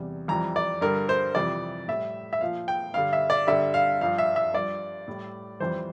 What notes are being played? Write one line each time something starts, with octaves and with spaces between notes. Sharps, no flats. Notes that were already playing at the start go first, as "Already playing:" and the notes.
Already playing: E2 C3 G3
F2 E3 G3 A#5
D5
G2 D3 G3 A#4
C5
F2 C3 E3 G3 D5
A2 G3 E5
E5
A#2 F3 F5
G5
G2 D3 G3 F5
E5
D5
G2 D3 G3 E5
F5
G2 F3 F5
E5
E5
G2 F3 D5
A2 G3
F2 E3 G3 C5